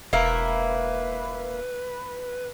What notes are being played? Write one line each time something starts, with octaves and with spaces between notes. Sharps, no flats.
E1 A#3 E4 B4 F5